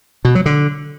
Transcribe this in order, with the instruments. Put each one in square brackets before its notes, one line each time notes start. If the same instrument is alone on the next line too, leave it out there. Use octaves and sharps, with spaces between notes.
[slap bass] B2
F#3
D3